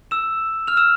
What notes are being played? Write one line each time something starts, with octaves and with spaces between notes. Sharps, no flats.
E6 E7
F6 F7
E6 E7